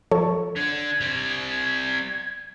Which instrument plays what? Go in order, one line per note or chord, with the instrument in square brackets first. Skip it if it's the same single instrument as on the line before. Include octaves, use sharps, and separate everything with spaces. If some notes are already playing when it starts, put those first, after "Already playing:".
[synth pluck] F3 A4 C#5
[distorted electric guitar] D3 D4 [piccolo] G#6
[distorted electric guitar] G3 C4
[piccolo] G#6